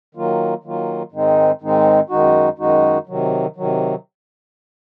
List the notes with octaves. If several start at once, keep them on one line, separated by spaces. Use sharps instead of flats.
D#3 F#3 A#3 F4
D#3 F#3 A#3 F4
G#2 D#3 G#3 C4 D#4
G#2 D#3 G#3 C4 D#4
F#2 D#3 G#3 D#4 F#4
F#2 D#3 G#3 D#4 F#4
C3 D#3 F#3
C3 D#3 F#3